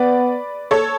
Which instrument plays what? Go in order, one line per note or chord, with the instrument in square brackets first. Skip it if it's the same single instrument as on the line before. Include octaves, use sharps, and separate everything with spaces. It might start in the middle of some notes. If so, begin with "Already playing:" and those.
Already playing: [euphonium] B3 [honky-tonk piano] B4 D5
[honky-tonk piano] A4 C#5